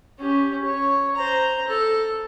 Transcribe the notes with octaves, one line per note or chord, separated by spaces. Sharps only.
C#4 G4
C#5
C5 A#5
A4